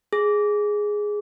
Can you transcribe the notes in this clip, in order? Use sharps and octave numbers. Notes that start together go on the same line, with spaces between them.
G#4